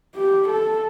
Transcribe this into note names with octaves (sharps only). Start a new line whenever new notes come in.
G4
A4